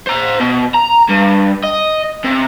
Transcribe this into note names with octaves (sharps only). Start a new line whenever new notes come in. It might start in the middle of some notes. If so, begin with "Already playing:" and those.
C5 A#5
B2
A#5
G2
D#5
C3